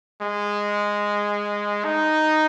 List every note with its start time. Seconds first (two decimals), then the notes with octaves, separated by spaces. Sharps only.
0.22 G#3
1.84 D#4